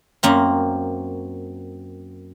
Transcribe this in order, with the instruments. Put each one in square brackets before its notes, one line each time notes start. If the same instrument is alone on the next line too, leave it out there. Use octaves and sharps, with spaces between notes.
[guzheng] F#2 A#3 C4